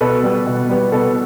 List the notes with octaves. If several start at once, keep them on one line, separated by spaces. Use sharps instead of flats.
B2 A4 B4
G3 B3
B2
G3 B3
B2 A4 B4